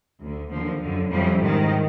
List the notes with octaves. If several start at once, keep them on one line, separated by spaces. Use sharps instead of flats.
D2 D3
D#2 D3 F3
F#2 D3
F2 C#3 E3 F3 G3
G#2 D#3